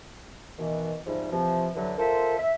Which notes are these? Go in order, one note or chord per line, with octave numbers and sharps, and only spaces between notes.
B2 D#3 E3
G#2 C3 F3 G3
C3 E3 F3
G2 D3 E3 F#3
F4 A4 A#4 C5 E5
E5